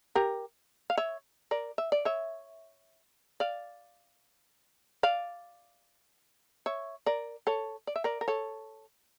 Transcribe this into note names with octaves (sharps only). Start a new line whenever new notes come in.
G4 A#4
F5
C#5 E5
A#4 D5
E5
D5
C#5 E5
D5 F5
D5 F5
C#5 E5
A#4 D5
A4 C#5
D5
E5
A#4 D5
A#4
A4 C#5